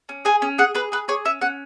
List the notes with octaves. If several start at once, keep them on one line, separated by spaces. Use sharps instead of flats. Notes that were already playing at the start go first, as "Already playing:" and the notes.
C#4
G#4 G#5
C#4
G#4 F#5
G#4 B4
G#4 B4
G#4 C#5
C#4 E5
C#4 F#5